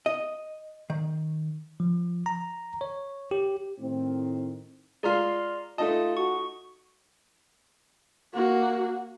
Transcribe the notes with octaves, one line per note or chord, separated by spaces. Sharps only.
D#5
D#3
F3
A#5
C#5
G4
A2 D#3 C4
G#3 F4 D5 A#5 C6
A3 D#4 F4 D#5 A5
F#4 C#6
A#3 F#4